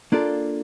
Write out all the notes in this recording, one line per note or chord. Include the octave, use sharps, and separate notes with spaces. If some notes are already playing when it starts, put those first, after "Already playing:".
A#3 D4 F4 A4 D5